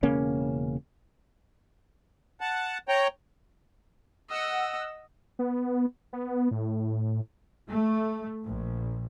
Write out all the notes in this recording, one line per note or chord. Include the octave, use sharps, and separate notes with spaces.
E1 C#3 A#3 C#4
F#5 A5
C#5 G5 A#5
D#5 F#5 E6
B3
B3
A2
A3
A#1